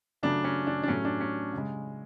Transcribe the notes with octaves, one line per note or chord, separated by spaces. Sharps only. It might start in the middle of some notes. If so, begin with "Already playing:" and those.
C#3 F#3 A3 D4
C#4
D4
D4
A2 F#3 A3 C#4
D4
C#4
C#3 G#3